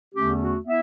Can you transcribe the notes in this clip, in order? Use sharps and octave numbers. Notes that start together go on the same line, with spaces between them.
E2 D3 A3 C#4 G4
F#4
B3 E4 E5